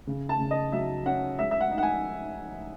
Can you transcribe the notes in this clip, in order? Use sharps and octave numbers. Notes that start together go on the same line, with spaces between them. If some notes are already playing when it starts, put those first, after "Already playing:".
C#3
A5
C#3
D#5
F#3 E5
C#4 F#5
G#3 E5
E5
F#5
D#4
F#5
G#5